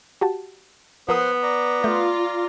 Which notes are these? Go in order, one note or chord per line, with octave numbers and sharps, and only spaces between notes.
F#4 G4 A5
F3 B3 A#4 C5 F#5 C6 D#6
D5 A#5
A3 F4 G6 A#6